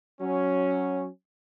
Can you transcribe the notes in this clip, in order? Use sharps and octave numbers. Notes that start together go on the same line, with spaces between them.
F#3 C#4